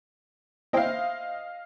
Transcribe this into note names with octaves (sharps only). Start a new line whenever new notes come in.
E4 C5 D#5 F5 G5